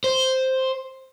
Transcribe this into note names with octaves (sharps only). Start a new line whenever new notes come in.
C5